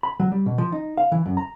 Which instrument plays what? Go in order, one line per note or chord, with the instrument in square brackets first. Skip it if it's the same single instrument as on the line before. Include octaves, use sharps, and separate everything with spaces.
[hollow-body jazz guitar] B5
F#3
G3
B2
F3
D#4
F5
E3
F#2
A#5